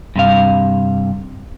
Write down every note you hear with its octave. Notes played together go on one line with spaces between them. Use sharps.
G2 C3 F5